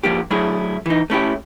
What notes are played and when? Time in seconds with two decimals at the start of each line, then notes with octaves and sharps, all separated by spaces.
0.03 F3 A#3 D4 G4
0.31 F#3 A3 D4 E4 G#4
0.86 E3 D#4
1.10 A3 C#4 E4 G4